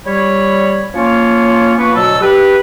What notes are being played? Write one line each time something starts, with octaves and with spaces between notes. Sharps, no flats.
G3 C#5 B5
F3 A#3 C#4 F4 C#5
F3 A#3 B3 B4 C#6
D2 B2 F#3 A4 A5 E6
G4 B4